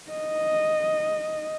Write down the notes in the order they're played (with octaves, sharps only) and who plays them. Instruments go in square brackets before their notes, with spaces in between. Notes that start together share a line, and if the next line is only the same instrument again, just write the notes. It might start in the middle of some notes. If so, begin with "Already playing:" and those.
[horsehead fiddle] D#5